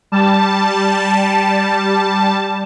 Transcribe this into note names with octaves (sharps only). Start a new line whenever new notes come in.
G3 A5